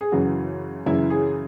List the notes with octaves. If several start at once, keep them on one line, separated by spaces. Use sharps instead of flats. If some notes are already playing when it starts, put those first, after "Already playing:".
G#4
F#2 C#3 E3 F#4
F#2 C#3 E3 E4
G#4